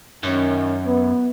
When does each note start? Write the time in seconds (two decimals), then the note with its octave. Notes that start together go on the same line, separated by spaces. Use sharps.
0.23 F#2 D#3 C#4
0.85 B3